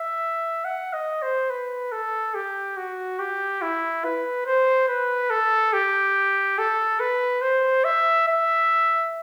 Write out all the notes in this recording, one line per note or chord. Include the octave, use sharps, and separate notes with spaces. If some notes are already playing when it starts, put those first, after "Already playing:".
Already playing: E5
F#5
D#5
C5
B4
A4
G4
F#4
G4
E4
B4
C5
B4
A4
G4
A4
B4
C5
E5
E5